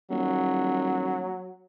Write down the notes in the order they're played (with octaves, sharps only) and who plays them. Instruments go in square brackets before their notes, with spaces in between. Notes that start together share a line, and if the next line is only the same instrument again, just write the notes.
[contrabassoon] D#1 [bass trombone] F#3